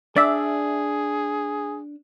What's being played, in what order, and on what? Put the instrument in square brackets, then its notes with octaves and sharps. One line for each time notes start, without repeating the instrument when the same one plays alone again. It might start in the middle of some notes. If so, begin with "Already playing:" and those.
[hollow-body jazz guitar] D4 [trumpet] G#4 [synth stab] D5 E5